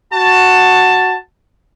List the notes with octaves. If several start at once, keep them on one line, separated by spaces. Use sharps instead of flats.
F#4 A5